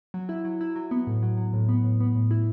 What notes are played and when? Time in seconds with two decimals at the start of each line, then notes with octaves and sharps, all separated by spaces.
0.14 F#3
0.29 E4
0.45 F#3
0.61 E4
0.76 F#3
0.91 B3
1.07 A2
1.23 F#3
1.37 F#3
1.53 A2
1.69 B3
1.84 A2
2.00 B3
2.15 A2
2.31 E4